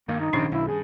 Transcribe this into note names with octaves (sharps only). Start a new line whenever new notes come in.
G2 D#3 A#3
D#4
A#1 G2 C3 D#3 C#4 D4
B1 E4
G2 G#4